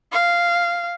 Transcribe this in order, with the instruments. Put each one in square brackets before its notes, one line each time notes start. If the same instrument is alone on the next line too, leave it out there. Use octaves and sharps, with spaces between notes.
[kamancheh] F5